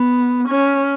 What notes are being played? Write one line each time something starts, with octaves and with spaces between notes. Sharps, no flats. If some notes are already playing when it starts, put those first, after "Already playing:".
Already playing: B3
C#4